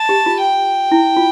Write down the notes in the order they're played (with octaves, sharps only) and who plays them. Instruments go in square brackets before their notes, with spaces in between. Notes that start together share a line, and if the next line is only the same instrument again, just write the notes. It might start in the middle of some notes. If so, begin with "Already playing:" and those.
Already playing: [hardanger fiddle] A5
[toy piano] G4
F4
[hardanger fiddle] G5
[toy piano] E4
F4